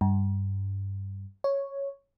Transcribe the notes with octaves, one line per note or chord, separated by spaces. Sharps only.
G2
C#5